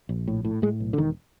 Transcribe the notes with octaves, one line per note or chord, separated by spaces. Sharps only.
A#1
A2
A2
A2 G#3
B1
D3
E1 D#3